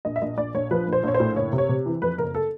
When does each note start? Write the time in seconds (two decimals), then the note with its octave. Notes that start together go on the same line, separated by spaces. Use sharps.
0.05 A#1 D#5
0.16 E5
0.22 A#1 D#5
0.37 A#1 D5
0.54 A#1 C#5
0.71 F3 B4
0.87 A#1
0.93 C5
1.03 A#1 C#5
1.14 C5
1.20 A2
1.36 F#1 C#5
1.53 C3
1.58 C#5
1.69 C3
1.86 E3
2.02 F2 B4
2.18 F#1 A#4
2.35 A4